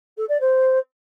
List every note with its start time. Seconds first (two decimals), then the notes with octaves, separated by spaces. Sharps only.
0.17 A4
0.28 D5
0.40 C5